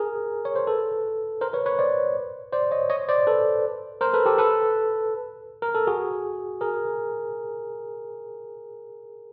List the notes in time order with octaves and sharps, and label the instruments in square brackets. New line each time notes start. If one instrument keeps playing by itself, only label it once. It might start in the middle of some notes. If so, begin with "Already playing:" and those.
Already playing: [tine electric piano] G#4 A#4
C#5
C5
A4 B4
A#4 C5
B4 C#5
B4 C#5
C5 D5
C5 D5
C#5 D#5
C#5 D#5
C5 D5
A4 B4
A#4 C5
A4 B4
G4 A4
A4 B4
A#4
A4
F#4 G#4
G#4 A#4